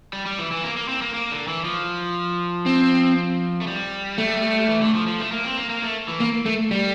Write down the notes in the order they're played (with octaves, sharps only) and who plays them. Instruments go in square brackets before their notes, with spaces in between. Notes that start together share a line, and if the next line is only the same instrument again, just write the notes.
[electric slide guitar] G3
G3
E3
E3
A#3
A#3
C4
A#3
A#3
D3
E3
F3
[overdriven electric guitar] C4
[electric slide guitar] A3
G3
[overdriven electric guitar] A3
[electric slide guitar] E3
D3
F3
F3
A3
A#3
C4
A#3
A#3
A3
E3
[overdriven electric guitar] A#3
A3
G3